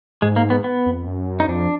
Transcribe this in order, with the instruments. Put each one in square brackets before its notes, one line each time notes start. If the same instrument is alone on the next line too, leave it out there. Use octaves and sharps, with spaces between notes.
[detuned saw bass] G#2 [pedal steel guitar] G#3
[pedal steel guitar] A#3
B3
B3
[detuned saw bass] F2
F#2
[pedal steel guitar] D#4
[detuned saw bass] F2 [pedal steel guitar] D4